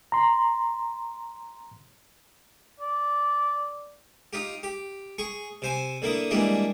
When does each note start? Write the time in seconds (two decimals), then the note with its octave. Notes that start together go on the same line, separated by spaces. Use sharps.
0.12 A#5 C6
2.80 D5
4.33 D#4 F4 G4
4.63 G4
5.18 G#4 C#6
5.62 C3 C5 G#5
6.02 D3 A#3 E4 D#6
6.31 E3 G3 G#3 A#3 D4 E4